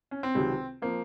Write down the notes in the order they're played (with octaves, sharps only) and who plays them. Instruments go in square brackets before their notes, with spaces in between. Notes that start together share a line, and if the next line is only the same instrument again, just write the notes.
[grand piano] C#4
C4
[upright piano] C#2 C3 D#3 F#3
[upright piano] F3 C4 [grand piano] A#3